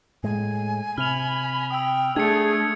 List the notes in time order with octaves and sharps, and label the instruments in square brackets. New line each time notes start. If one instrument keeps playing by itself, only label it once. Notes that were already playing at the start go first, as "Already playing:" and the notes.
[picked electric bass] A2 G#3 [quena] G#5
[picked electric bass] C3 [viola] B5 [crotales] F6 F7
[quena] G5 [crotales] D#6 E6
[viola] A3 [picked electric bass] D4 [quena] G#4 [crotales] G#6 C#7